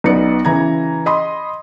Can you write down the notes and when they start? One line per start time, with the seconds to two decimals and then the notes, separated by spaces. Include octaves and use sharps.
0.04 B1 B3 D#4 D5 C#7
0.45 C#3 E3 A#5 G#6
1.06 D#5 B5 C6 D#6